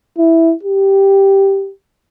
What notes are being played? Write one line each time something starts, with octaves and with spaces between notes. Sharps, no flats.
E4
G4